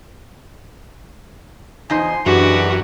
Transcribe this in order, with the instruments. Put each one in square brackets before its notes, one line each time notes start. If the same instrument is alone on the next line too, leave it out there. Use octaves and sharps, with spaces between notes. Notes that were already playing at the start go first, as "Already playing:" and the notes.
[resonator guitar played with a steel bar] E2 D#4 D#5 [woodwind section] F3 G#5 C6
[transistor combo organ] F#2 [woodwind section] E3 G4 [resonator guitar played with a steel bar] G#3 D4 [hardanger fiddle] F#4